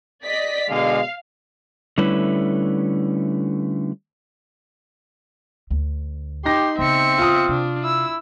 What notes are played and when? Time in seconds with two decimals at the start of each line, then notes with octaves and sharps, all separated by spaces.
0.25 D5 D#5 B6
0.68 B2 D3 G#3 F5
1.98 D3 G3 A3 C#4 E4 B4
5.71 D2
6.45 D#4 G4 C6 A#6
6.78 C#3 B3 C4 E5 C#7
7.18 F4 D#6
7.49 C3 D4
7.84 E4 E6